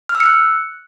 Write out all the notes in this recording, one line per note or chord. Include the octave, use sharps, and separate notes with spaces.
F6
E6
C#7
F#6